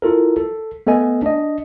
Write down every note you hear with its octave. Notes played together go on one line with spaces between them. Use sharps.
E4 F4 A4 A#4
A4
A3 B3 A4 D#5 G#5
D4 D#5